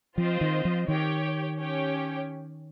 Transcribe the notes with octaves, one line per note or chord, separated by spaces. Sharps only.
F3 C4 F4 C5 D#5
D#3
F3
D#3 G4 C#5 G5
C#4 G4 C#5 G5